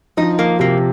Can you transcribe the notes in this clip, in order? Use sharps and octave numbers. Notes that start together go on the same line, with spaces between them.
F3 D#4
A#3
C3 A#3